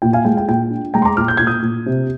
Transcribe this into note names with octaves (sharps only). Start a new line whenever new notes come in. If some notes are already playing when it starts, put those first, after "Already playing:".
A#2 G5
F5 G#5
G#3 G5
G5
A#2 G5
D4
G#3 G5 A#5
C6
A#5 D6
A#2 D6 F6
G6
A#2 G#6
D#6 G6
A#2
C3